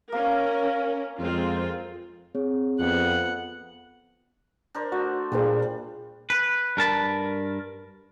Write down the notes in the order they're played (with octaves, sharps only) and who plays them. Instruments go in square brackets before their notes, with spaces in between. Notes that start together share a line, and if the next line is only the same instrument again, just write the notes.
[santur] A#3 [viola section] C#4 A#4
[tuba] F2 [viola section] G#3 C4 F4
[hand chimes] C4 G#4 C#5
[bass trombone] F2 [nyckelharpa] B3 F#5
[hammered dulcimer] D4 A#4 C5
[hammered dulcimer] A3 [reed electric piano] F#4
[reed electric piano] A#2 [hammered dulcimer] G3 D4 F4 [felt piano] G#4 C5
[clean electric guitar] B4
G2 A#4 A5 B5